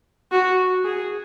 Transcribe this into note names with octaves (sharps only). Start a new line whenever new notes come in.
F#4
G#4